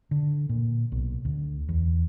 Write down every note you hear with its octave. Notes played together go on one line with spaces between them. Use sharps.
D3
A#2
B1
D2
E2